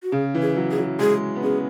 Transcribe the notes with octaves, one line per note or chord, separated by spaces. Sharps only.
F#4
C#3 G#4
E3
G#4
F#3
G#4
F#3
G#3 G#4
B3
C#4 G#4